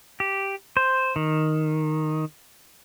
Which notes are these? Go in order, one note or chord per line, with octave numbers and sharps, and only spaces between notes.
G4
C5
D#3